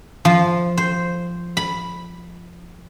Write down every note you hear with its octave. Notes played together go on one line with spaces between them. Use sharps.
F3
C5
B5